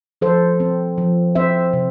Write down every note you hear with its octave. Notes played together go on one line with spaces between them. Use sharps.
F3 A4 C5
C4
F3
C4 C5 E5
C3